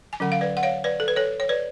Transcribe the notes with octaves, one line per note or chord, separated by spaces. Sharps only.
G#5
D3 F#3 C#4 F#5
F5
B4 D5
F#5
C#5 F5
B4 D5
A4
B4
A4 C#5
C#5
B4 D5